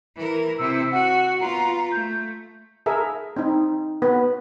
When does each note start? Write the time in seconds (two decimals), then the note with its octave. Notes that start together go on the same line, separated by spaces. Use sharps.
0.16 E3 A#4
0.58 C3 E4 E6
0.92 F#4 F#5
1.40 B3 F4 A#5
1.92 A3 G6
2.86 G#4 A#4 E5
3.36 C4 D#4
4.02 B3 B4